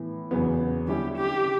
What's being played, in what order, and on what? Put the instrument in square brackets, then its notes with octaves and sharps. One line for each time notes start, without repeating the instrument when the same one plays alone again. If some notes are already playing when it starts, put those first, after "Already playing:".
Already playing: [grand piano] A2 E3 B3
E2 C#3 F#3 B3
[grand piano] D3 G3 C#4 E4 [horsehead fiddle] G4
[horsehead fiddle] G4
[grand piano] C#3